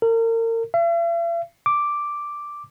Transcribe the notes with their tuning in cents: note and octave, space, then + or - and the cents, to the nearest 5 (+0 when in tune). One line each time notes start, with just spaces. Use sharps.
A#4 -35
E5 +45
D6 +0